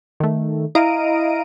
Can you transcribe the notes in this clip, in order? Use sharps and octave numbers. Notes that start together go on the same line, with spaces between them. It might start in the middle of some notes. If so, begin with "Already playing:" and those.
D#3 A3
E4 D#5 F5 A#5 D7 D#7